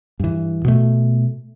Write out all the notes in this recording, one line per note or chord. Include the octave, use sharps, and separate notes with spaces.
G2 E3
B2 A3